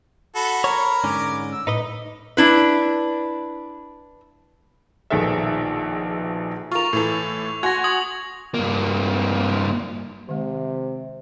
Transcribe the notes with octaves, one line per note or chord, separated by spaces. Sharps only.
F#4 A4 B5
A#4 C#5
G#2 D3 C#4 D6
E6
A2 D#4 B4 D#5
D4 E4 B4
A#1 B2 D#3 G#4 A4 E5
F4 A#4 C#6 F7
A2 E3 A4
F#4 G#5 C6 G#6 A#6
D#6 G#6 F#7
G2 A#3
C3 D#3 G#3